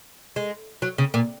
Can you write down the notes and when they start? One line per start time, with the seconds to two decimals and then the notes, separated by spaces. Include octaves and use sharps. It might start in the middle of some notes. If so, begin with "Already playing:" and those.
0.36 G#3
0.82 F#3
0.98 C#3
1.14 A#2